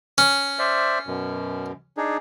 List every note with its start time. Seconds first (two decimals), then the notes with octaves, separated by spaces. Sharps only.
0.18 C#4
0.59 C5 D5 E5
1.07 F#2 B2
1.97 D4 D#4 G#4